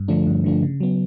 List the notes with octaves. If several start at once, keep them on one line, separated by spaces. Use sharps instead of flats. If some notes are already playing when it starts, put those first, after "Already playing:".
Already playing: G2
D3 F3 A3 D4
G2
D3 F3 A3 D4
C#3
F#3 B3